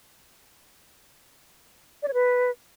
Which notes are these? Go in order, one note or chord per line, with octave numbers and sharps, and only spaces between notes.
D5
C#5
B4